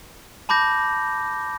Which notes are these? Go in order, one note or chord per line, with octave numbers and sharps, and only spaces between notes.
A5 B5 D6 G6 A#6